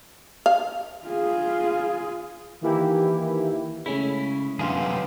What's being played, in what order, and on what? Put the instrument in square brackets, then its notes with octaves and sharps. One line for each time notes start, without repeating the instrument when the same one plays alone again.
[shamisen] F5
[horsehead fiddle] F4 G#4
[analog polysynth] D#3 E3 A#3 E4 G4
[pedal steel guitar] C#3 E4 [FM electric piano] G#3 A3 C#4
[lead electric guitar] F#2 D3 [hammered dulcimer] B3 F5 C6 [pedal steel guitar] G4 G#4